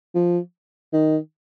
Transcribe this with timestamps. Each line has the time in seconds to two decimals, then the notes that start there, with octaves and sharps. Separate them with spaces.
0.15 F3
0.93 D#3